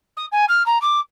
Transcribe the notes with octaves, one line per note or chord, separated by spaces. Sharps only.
D#6
G#5
F6
A#5
D6